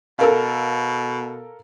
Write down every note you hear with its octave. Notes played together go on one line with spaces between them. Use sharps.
B2 A4 A#4 F5